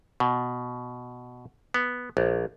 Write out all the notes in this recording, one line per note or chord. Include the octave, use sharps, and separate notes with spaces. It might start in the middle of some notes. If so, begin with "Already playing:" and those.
B2
B3
A#1